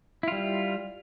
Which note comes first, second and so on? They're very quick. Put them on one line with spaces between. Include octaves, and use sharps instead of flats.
E4 F4 G3